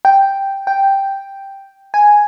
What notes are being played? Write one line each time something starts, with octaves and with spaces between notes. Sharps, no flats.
G5
G5
G#5